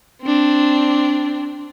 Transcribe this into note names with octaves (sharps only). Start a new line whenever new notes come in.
C4 D4